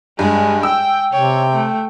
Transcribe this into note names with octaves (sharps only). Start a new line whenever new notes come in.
G2 G#3
G5 E6
C3 C#5 G5
A3